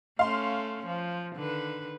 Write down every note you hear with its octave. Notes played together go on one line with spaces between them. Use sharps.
A3 C#4 F5 C6
F3
D3 D#3 B4